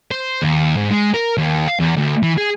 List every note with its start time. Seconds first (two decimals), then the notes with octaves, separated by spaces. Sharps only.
0.11 C5
0.42 D#2
0.77 G#2
0.91 G#3
1.14 A#4
1.37 D#2
1.68 F5
1.79 E2
1.96 D2
2.23 E3
2.38 G#4